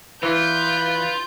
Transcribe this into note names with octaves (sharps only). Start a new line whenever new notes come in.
E3 F4 B4 G6